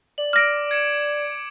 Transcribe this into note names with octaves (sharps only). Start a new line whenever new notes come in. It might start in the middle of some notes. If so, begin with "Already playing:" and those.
D5 F#7
D6 F6 A#6 D7
G#6 C#7 E7